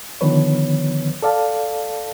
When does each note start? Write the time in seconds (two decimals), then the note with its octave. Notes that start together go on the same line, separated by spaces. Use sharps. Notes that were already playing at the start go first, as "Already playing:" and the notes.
0.21 D3 D#3 F3 B3 B4 C#5
1.22 A4 D5 F5 A5